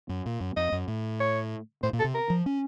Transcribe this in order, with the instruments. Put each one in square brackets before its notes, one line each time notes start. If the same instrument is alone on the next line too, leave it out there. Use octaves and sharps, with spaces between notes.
[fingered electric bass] F#2
A#2
F#2
[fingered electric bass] F2 [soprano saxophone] D#5
[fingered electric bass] F#2
A2
[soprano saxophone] C#5
[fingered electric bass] A2 [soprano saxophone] C5
[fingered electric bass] A#2
[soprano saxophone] A4
[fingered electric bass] C3
[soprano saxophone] A#4
[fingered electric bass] F3
C#4